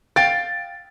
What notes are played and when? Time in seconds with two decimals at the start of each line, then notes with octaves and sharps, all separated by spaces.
0.16 F5 G5 A6